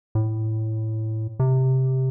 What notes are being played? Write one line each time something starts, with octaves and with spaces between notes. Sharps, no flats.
A2
C3